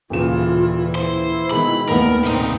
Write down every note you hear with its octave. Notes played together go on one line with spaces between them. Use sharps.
D#1 A#2 C#3 E3 F4 E7
E4 C5
B2 D#3 G#3 B5
D#1 A#2 D#3 A3 B3 A#4
C2 A2 C4 D#4